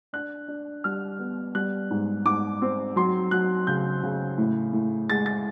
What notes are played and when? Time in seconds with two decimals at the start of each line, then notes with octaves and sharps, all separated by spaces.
0.13 D4 F#6
0.48 D4
0.84 G3 F6
1.19 B3
1.55 G3 F#6
1.91 G#2
2.25 G#2 D6
2.62 C4
2.96 F#3 C6
3.31 F#3 F#6
3.67 C#3 G6
4.03 C#3
4.38 A2
4.73 A2
5.10 G#3 A6
5.26 A6